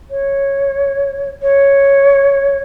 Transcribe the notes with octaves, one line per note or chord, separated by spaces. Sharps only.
C#5
C#5